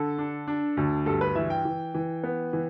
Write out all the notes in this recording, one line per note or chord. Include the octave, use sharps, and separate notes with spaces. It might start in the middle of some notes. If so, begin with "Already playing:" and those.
Already playing: D3 A4
D4
D4
D2
G2 A4
B4
E3 E5
G5
E3
E3
B3
E3